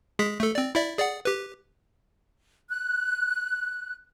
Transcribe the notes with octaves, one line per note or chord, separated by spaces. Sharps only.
G#3 G#4 B6
A3 A4
C4 D5
E4 D5 E5
G#4 D5 F#5
G4 B4
F#6